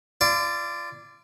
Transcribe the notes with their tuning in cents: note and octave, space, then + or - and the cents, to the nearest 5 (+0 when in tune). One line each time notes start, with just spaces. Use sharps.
F4 -35 D5 +0